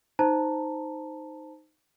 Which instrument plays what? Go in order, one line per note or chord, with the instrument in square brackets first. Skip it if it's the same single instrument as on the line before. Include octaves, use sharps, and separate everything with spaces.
[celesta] D#4 C5 A5 A#5